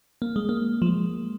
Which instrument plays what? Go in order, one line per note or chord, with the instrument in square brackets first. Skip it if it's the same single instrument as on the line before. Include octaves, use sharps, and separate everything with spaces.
[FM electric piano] A#3
G#3
A#3
F3
G#3